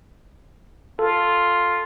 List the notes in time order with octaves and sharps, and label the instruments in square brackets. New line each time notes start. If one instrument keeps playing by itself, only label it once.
[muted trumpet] F4 [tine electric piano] A4